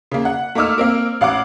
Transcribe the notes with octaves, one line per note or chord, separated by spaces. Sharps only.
C#3 A#3
F#5
A3 A#3 D#4 D6 E6 F6
A#3 C4 A#4
A1 F5 F#5 D6